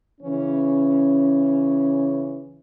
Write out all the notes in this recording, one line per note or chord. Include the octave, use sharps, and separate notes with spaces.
C#3 E3 C#4